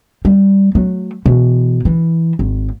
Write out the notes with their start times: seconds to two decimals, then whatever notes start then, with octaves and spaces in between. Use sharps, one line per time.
0.25 G3
0.75 F#3 A3
1.26 B2 E3
1.85 E3
2.39 G#1